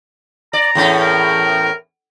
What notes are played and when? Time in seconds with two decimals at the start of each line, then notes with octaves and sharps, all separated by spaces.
0.53 D5 A#5
0.75 E2 A2 C#4
1.01 A#4